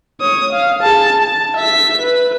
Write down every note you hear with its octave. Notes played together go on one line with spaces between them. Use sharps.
C#5 D#6
F5
G#4 A5
A5
E5 B6
B4